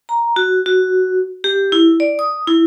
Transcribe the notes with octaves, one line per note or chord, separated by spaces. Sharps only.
A#5
F#4
F#4
G4
E4
D5
D#6
E4